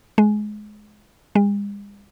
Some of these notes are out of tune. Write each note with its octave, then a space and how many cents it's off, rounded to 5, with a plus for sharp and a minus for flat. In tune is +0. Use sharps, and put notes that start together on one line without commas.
G#3 +20
G#3 -45